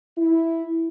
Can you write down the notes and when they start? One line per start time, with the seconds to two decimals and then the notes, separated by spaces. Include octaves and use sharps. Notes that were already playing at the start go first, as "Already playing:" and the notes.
0.18 E4